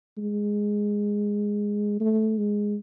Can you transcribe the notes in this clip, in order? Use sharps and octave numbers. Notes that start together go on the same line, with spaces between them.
G#3
A3
G#3